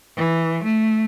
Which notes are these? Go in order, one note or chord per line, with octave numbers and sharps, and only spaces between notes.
E3
A3